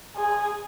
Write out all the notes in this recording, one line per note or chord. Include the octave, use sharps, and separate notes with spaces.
G#4